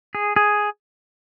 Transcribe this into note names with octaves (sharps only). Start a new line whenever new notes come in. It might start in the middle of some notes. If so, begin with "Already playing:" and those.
G#4
G#4